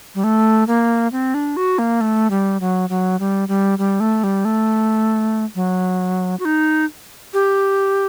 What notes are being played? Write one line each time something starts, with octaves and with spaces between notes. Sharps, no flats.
G3
A3
A#3
C4
D4
F#4
A#3
A3
G3
F#3
F#3
G3
G3
G3
A3
G3
A3
F#3
F#4
D#4
G4